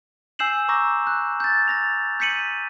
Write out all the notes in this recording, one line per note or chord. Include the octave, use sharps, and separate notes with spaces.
G#5 E6 G6 C7 E7 F#7
A#5 C#6 D6 E6 G6 A#6
F#6
G6 A6
A6 A#6 F7
G6 B6 C#7 D#7 F#7